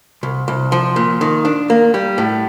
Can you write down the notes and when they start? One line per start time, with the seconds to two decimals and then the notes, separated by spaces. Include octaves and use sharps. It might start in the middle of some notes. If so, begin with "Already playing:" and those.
0.23 C2
0.48 C2
0.72 F3
0.96 A#2
1.21 D#3
1.45 D4
1.70 A#3
1.94 G3
2.18 A2